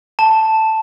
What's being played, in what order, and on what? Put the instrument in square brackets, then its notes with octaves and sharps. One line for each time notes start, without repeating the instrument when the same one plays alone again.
[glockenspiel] A5